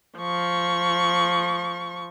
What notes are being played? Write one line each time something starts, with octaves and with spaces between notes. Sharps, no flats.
F3 C#6